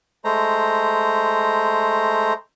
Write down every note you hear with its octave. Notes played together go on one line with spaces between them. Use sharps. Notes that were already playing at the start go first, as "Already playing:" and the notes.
G#3 A3 C5 A#5